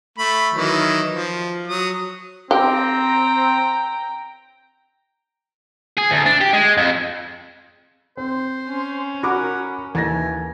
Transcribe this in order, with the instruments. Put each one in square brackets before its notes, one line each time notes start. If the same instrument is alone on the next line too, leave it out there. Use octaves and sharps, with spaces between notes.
[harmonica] A3 B5
D#3 E3 F#3
F3
F#3 D#6
[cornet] C4 [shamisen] G4 [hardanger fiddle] G5 A#5
[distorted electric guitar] G#4
D2
D4
G4
G#3
F2
[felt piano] C4 [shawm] C5
[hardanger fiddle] C#4
[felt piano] F#4 B5 D6 [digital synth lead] A#4 [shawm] F#5
[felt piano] D#2 A6 A#6 [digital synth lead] E3 [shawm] G#5